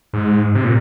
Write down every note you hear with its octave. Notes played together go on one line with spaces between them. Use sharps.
G#2
C3
A#2